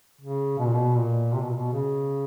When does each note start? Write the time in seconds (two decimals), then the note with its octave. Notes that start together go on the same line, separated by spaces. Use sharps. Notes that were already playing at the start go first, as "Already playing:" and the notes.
0.21 C#3
0.59 B2
0.66 A#2
0.74 B2
0.97 A#2
1.35 C3
1.43 B2
1.50 A#2
1.57 B2
1.73 C#3